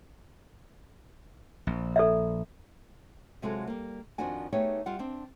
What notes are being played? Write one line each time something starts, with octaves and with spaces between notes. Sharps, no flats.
A#1
A4 D5 E5
C3 F#3 G#3 F4 F#4 A4
G3 A#3
F2 D#3 F3 D4 F#4 G#5
A3 B3 D#4 G4 G#4 C#5
G3 F4 F#5
C4 D4